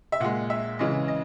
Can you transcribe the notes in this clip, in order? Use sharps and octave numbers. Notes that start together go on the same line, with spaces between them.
E5
A#2 G#3 F#5
E5
C#3 E3 G#3 D#5
D#5